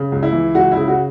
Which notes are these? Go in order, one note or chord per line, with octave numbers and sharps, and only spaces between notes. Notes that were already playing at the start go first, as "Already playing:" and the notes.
Already playing: C#3
C#2
E4
E3
C#2 F#4
C#3 E4
F#4